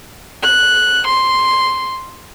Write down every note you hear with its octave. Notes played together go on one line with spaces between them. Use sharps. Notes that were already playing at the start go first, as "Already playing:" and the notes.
F#6
C6